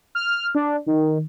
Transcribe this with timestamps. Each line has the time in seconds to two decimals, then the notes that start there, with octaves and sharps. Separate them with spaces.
0.15 F6
0.55 D4
0.86 D#3